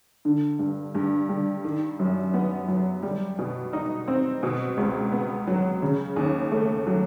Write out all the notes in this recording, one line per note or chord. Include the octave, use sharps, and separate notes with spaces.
D3
G2
G2
G3
D#3
F#2
B3
F#3
G3
B2
D#4
C4
B2
C#2
B3
F#3
C#3
D#2
A3
F#3